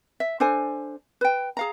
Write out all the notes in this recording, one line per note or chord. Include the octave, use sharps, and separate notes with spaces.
E5
D4 A4 C5 G#5
B4 G5
G#4 F5 A#5